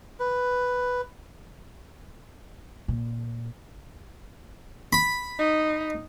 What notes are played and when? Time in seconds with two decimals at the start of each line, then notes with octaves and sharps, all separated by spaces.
0.20 B4
2.88 A#2
4.93 B5
5.39 D#4